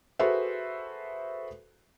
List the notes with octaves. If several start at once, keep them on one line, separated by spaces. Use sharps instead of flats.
F#4 G#4 A4 B4 C5 E5